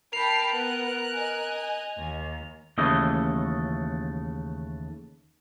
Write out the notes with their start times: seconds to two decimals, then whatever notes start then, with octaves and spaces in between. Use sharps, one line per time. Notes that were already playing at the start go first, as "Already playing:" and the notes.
0.13 A#4 G5 A5 B5 C7 F7
0.52 B3 F#6
1.14 D#5 G#5
1.97 D#2
2.78 D#2 C#3 E3 A3 D#5